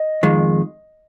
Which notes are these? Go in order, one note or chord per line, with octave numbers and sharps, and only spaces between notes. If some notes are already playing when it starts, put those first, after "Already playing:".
Already playing: D#5
F2 D#3 G#3